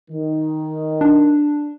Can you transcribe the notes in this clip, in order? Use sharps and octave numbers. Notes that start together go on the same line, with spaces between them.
D#3
D4